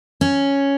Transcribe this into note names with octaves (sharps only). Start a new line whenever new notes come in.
C#4